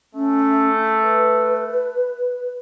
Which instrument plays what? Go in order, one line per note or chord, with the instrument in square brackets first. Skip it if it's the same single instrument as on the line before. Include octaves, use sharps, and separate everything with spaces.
[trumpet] A3 [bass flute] C#4
[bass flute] B4